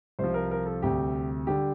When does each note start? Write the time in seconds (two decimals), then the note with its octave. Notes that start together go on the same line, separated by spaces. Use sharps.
0.19 C2 C3 F3 C5
0.34 A#4
0.51 A#4
0.66 A4
0.82 D2 C3 G3 G4
1.47 D3 G3 G4